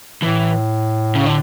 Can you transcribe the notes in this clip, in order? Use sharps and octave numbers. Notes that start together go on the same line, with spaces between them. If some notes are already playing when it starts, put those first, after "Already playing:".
A2 E3
C#3
D3